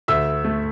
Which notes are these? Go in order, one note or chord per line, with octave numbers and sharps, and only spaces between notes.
D2 E5 E6
A3